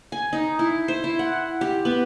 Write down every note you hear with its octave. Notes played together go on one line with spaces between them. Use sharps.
G#5
D#4
E4
C5
E4
F#5
G4
B3